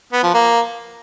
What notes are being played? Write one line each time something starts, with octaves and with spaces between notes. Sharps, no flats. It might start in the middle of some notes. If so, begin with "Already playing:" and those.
B3
F3
A#3